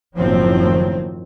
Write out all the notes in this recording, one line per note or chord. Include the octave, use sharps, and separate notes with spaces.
F#1 A2 D#3 F3 F#3 C4